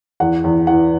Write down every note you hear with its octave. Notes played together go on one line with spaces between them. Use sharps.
E2 F#5
E2
E3 F#5